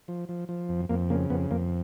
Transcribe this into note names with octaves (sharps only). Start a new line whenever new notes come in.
F3
F3
F3
F2
F2 A#3
C#3 A#3
F2 B3
F2 A#3